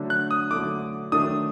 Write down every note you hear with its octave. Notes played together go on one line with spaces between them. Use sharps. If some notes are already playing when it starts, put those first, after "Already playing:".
Already playing: D3 F#3 A3 D4
F#6
D#6
D3 F#3 A3 D4 D6
D#3 F#3 A3 D4 D#6